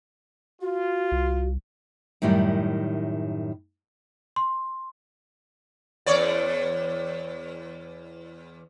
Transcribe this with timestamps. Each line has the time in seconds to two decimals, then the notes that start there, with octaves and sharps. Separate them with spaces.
0.61 F4 F#4
1.12 C2
2.22 F#2 A2 D#3 G3 E4
4.36 C6
6.06 E2 C#5 D5